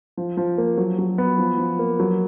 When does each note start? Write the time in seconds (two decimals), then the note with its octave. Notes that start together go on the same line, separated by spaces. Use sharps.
0.17 F3
0.37 F3
0.58 A#3
0.78 F#3
0.98 F#3
1.18 B3
1.38 F3
1.58 F3
1.79 A#3
2.00 F#3